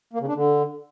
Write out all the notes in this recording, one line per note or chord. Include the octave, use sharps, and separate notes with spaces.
A#3
C#3
D4
D3